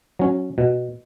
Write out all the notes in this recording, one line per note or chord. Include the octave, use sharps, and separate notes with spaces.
F#3 C#4
B2